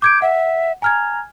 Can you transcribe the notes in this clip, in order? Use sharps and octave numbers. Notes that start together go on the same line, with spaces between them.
D6 G6 G#6 D7
E5 F#5
G#5 A#5 F6 G#6